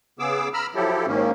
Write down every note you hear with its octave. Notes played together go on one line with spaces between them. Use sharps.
C#3 B3 G#4 D6 E6
A#5 B5 E6 F6
F3 F#3 E4 G4 A4
G#2 D#3 A#3 C#4